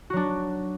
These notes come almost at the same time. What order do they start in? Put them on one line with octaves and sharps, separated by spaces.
F#4 F#3 D4